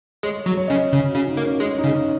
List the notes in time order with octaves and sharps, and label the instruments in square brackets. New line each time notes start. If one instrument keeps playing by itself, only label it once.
[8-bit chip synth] G#3 [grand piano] C#5
[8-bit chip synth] F#3
[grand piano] C#5
[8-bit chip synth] C#3 [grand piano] D#5
[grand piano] C#5
[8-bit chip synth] C#3
[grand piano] F#4
[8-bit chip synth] C#3
[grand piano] D#4
[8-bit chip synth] A#3
[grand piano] C#4
[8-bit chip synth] G#3 [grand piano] C#4
[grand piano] D#4
[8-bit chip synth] C#3
[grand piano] C#4